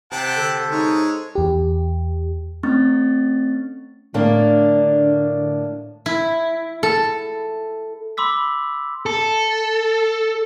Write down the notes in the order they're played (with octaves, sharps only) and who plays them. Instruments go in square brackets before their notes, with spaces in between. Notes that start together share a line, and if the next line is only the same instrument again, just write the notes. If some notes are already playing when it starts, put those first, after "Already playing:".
[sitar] C3 [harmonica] F#5 G5 A5
[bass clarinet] D3 [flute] A4
[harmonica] G#3 C#5 [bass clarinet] D#4
[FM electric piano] E2 G4
[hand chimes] A3 C4 C#4 C#6 F6 A6
[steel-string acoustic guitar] A2 A#3 D4 [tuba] D3
[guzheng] E4
A4
[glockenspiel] B5 C6 D6 E6 B6
[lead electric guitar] A4